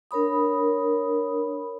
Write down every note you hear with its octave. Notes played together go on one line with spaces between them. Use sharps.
D4 A#4 C#5 B5 D#6